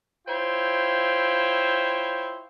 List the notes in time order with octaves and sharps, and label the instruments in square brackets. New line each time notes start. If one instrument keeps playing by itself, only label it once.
[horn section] E4 F4 C5 C#5 E5 G5